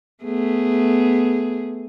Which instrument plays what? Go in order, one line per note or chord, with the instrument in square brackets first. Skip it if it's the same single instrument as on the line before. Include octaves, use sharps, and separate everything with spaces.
[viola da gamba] A3 B3 G#4